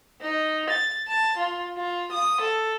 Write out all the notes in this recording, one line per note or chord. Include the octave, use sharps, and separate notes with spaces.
D#4
A6
A5
F4
F4
D#6
A4